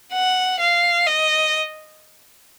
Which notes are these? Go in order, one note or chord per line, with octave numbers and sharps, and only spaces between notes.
F#5
F5
D#5